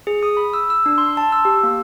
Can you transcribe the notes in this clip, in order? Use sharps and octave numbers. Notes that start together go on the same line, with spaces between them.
G#4
D#6
B5
E6
E6
D4
C6
A5
E6
G4
A#3